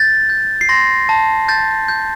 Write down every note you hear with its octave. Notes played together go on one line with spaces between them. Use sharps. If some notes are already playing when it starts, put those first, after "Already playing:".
Already playing: G6 A6
G6
C7
C6 A#6
A5
G6 A6
G6